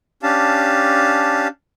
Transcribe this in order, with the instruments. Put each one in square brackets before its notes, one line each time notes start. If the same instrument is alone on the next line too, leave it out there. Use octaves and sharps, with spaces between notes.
[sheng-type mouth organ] C#4 D4 G4 F5 A5